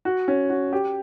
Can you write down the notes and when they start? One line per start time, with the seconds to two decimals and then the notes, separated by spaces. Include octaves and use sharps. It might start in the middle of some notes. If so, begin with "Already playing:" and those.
0.05 F#4
0.28 C#4
0.50 F#4
0.73 G4